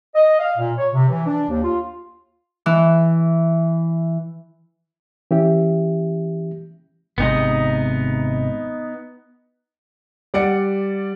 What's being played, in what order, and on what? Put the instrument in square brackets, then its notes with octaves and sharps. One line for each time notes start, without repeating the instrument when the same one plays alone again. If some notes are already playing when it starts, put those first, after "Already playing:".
[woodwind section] D#5
F5
A#2
C#5
C3
E3
D4
D#2
F4
[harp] E3
[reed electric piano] E3 C#4 G4 E5
[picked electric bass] G#1 C3 G#3 [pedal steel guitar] B3 D#4 D#5
[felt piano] G3 D5 F#5 C#7